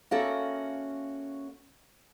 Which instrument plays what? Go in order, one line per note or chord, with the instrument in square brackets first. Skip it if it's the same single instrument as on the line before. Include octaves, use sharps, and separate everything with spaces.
[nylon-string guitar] A#3 C#4 F#4 A4 E5 F5